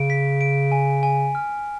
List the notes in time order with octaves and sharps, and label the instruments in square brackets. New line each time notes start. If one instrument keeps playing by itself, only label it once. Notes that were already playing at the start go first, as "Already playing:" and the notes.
Already playing: [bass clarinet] C#3 [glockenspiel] D7
[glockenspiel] B6
D7
G#5
G#5
F6